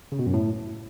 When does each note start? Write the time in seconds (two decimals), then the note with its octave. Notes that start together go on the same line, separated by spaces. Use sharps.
0.12 C#3
0.19 B2
0.26 F#2
0.34 A2